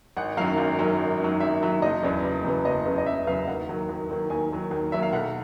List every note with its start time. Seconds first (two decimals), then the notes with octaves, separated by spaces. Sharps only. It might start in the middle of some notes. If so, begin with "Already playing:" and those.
0.17 G#1 F#5
0.37 F#2 D#3 F#3 F5
0.58 G#1
0.79 F#2 D#3 F#3
0.99 G#1
1.20 F#2 D#3 F#3
1.40 G#1 E5
1.61 F#2 D#3 F#3
1.82 F#1 D#5
2.03 E2 C#3 F#3 B3 D5
2.23 F#1
2.44 E2 C#3 F#3 B3
2.65 F#1 D#5
2.85 E2 C#3 F#3 B3
2.98 D#5
3.06 F#1 E5
3.27 E2 C#3 F#3 B3 F5
3.48 D#2 F#5
3.68 D#3 F#3 A#3
3.89 D#2
4.10 D#3 F#3 A#3
4.30 D#2 G#5
4.51 D#3 F#3 A#3
4.71 D#2
4.92 D#3 F#3 A#3 E5
5.02 F5
5.13 B1 F#5